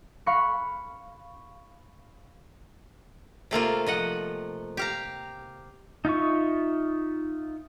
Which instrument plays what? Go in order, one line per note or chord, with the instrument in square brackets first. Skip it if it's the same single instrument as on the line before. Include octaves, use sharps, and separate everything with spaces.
[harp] F5 B5 C#6 F#6 A#6 C#7
[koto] C3 A3 A#3 F4
F3 D#5 F#5
G4 F5 A#5
[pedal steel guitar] D#4 F4 E5 C#6